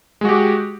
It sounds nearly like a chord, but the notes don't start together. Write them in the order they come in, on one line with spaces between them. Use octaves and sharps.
G#3 F#4 G4